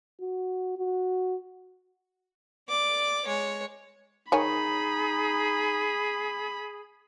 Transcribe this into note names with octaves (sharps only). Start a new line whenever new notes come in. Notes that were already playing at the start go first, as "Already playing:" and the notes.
F#4
F#4
D5 D6
G#3 C#5
D#3 D#4 G#4 C#5 G#5 B5